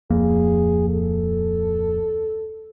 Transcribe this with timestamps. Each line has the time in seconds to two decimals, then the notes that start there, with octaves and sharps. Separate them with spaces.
0.10 D1 F2 A#3 G#4
0.89 A4